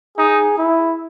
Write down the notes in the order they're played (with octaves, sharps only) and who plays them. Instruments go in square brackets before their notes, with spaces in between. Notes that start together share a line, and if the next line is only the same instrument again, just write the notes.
[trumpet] D#4 [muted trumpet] G#4
[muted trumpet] E4